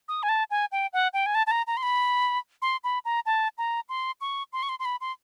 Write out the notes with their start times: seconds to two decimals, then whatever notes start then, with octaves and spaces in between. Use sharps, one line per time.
0.08 D#6
0.23 G#5
0.29 A5
0.51 G#5
0.72 G5
0.93 F#5
1.14 G5
1.26 G#5
1.35 A5
1.47 A5
1.51 A#5
1.67 A#5
1.77 C6
1.83 B5
2.62 C6
2.84 B5
3.05 A#5
3.26 A5
3.58 A#5
3.89 C6
4.21 C#6
4.53 C6
4.63 C#6
4.69 C6
4.79 C6
4.85 B5
5.01 C6